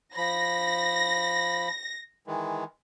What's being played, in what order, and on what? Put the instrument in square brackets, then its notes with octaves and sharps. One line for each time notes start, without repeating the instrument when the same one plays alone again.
[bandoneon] F3 B5 [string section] A#6
[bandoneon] D#3 E3 G#3